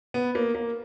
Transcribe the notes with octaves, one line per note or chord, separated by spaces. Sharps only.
B3
A#3
A#3